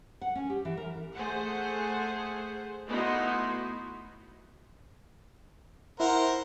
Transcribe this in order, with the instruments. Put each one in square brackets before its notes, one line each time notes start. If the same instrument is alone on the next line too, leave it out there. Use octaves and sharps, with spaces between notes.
[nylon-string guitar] F#5
C#4
G4
E3
A#4
[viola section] A3 G#4 C5 F#5
A3 B3 D#4 E4 F#4 C6
[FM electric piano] E4 [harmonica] A#4 C5 F#5